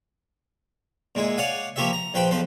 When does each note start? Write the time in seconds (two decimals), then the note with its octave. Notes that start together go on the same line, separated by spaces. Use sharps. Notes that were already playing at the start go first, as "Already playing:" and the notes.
1.15 A#2 G#3 E4 G#4
1.37 C#5 D5 F5 F#5 G#5
1.76 F3 A#3 F4 G4 C#5 E5
1.93 A#5
2.14 A#1 F3 B4 C5 G5 B5
2.31 B1 F3 B4 C5